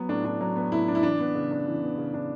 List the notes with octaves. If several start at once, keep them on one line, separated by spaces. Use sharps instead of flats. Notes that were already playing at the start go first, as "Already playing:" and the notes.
Already playing: F#3 B3
A2 D4
D4
F#3
B3
A2 E4
D4
E4
E3 D4
B3
C#3
D4
E3
B3
C#3
D4